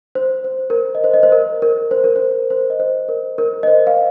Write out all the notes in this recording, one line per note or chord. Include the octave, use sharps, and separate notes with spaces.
C5
C5
A#4
C5
D#5
C5
D#5
C5
A#4
A#4
C5
A#4
C5
C5
D#5
C5
A#4
A#4
D#5
C5
F5